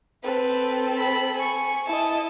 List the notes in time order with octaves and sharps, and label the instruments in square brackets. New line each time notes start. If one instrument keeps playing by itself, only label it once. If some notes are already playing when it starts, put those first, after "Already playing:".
[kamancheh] C4 A4 [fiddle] B4
[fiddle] B5
G#5 C#6
[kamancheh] E4 D#5 [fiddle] A5